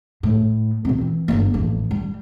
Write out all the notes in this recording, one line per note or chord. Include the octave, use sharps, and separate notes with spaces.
A2
A#2 C4
E3
G1 A#3
A1 F2
G3